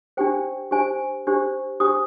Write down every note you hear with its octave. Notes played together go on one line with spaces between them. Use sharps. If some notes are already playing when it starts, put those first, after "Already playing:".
D4 G4 C5 G5
D4 G4 C5 G#5
D4 G4 C5
D4 G4 C5 D#6